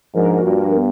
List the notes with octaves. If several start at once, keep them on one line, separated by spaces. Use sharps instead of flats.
G#2 F3 A#3 D4 F#4 A#4
G2
B3